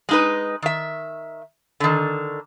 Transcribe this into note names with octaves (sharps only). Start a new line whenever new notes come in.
G#3 D#4 B4
D#3 E5
D3 D#3